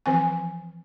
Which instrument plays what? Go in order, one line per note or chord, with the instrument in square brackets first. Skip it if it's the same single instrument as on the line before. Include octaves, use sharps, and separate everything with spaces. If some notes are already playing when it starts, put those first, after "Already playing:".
[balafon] E3 F3 C4 G#5